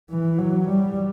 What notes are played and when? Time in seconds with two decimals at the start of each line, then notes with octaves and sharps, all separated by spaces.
0.10 E3
0.39 F#3
0.68 G3